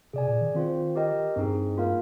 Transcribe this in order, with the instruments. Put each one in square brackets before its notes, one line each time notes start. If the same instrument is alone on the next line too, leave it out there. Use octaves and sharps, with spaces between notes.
[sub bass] C3 [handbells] G#4 D5 G#5
[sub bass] A#2
D#3
[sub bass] D#3 [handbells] C4 F4 C5
[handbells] G4 A#4 D#5 G5
[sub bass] G2 [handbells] C4 D#4 G#4
[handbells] A#3 F4 A#4 F5